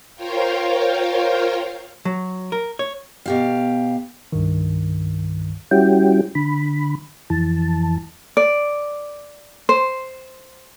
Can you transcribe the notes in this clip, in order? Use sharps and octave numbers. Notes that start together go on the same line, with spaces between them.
F4 A#4 C5 C#5 F5 G5
F#3
A#4
C#5
B2 G4 F5
C2 G2 D#3
G3 C#4 E4 F#4 G4 G5
D3 B5
F2 E3 A5
D5
C5